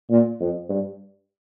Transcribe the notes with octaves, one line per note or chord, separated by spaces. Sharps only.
A#2
F2
G2